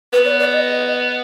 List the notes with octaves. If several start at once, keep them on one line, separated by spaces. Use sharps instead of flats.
B3 B4
D5
D5
D#5